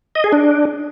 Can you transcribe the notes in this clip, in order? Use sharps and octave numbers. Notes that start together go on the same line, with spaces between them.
D#5
G#4
D4